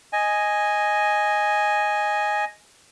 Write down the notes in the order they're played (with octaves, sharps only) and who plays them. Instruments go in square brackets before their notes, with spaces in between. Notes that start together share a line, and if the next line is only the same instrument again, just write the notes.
[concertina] D#5 G#5